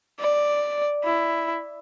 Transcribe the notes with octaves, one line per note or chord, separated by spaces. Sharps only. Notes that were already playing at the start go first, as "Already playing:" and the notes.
D5
E4